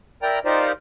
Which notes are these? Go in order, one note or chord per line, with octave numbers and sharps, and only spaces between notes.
E4 A#4 D5 G5 A#5
D#4 F4 G4 A#4 C5 D5